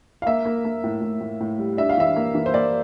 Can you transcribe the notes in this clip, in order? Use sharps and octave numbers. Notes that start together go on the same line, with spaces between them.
F5
A#3 E5
A#3
A#3
A2
A2
A2
A2
G3
D4 E5
F5
E3 E5
A#3
E3
C5
A#3 D5